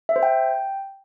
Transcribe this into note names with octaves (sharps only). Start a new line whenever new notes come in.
E5
C5
G5